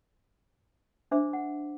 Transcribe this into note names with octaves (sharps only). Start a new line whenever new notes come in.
D4 C5 E5 D6
F#5